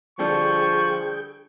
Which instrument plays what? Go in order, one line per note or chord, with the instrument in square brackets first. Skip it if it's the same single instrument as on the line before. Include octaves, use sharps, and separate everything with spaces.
[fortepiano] D3 G3 A4 [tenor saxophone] F3 [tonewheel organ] G#4 G5 [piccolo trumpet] C#6